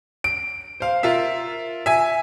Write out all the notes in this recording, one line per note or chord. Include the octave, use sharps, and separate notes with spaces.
D7
C5 F5
F4 A#4 E5
E5 G#5